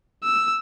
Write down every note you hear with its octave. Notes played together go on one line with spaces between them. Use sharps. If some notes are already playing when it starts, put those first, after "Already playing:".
E6